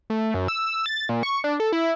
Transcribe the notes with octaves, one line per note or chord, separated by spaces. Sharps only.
A3
F#2
E6
A6
A#2
C#6
D4
A4
E4